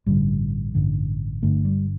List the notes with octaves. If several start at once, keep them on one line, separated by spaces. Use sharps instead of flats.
A1 G2 D3 G3
A1 G2 D3
G1 G2 D3 A3
G3